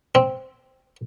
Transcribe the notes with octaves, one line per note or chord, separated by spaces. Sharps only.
C4